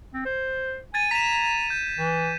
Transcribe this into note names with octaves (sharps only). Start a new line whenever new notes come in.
C4
C5
G#5 G#6 A6 D#7
A#5 B6 E7
G6
E3